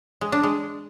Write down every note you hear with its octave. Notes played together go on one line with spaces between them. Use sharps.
G#3
D4
G#3